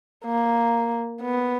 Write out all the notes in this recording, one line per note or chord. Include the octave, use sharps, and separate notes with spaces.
A#3
B3